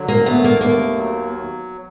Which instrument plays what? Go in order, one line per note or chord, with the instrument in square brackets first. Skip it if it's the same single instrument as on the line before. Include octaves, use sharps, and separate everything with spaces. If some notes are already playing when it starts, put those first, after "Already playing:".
Already playing: [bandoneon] D3 F#3
[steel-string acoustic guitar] A#3
[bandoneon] A3 [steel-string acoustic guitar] B3
[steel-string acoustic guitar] A#3
[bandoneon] D#2 [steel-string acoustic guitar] A#3
[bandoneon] F#3